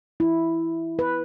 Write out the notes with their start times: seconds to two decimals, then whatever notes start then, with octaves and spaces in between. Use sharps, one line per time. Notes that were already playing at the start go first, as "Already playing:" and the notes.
0.20 E4
0.99 B4